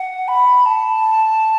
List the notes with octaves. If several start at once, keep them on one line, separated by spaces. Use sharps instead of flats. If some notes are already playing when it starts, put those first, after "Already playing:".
Already playing: F#5
B5
A5